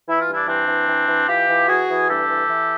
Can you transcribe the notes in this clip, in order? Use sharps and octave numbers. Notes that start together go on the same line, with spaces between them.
E3 E4
F4
G2
D4 E4
E3 C4 D4
E3
E3
E3
E3 F4 G4
E3
E3 F#4 G#4
E3
G2 G4 A4
E3
E3